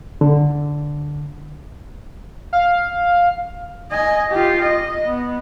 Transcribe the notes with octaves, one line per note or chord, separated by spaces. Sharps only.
D3
F5
D#5 G#5
F4 G4
D#5
B3